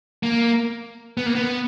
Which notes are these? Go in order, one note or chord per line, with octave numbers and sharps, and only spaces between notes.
A#3
B3
A#3
B3